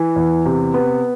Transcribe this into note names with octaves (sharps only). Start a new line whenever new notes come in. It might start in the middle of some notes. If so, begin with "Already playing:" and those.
Already playing: E3
E2
C3
B3